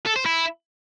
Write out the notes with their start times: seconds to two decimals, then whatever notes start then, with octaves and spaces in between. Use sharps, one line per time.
0.06 A4
0.16 C5
0.26 E4